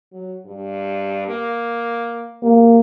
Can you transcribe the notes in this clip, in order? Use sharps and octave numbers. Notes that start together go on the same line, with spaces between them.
F#3
G2
A#3
A#3 G4